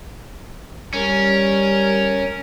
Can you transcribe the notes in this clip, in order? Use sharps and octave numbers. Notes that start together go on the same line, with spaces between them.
G3 C#4 A#4